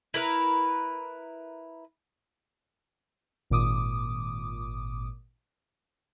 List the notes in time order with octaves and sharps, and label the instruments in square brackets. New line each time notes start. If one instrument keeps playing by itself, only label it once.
[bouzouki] E4 A#4 B4
[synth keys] G#1 A#2 D6 D#6